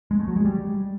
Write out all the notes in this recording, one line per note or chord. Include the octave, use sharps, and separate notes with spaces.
G#3
A3
F#3
G#3
G3